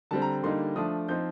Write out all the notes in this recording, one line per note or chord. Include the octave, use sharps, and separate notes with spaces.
D3 G3 C4 A5
A#5
D3 G3 A#3 D#4 C6
F3 A3 D4 D#6
F3 C4 D#4 G6